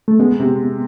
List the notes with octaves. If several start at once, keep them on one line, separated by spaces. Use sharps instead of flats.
A3
G#3 B3
C3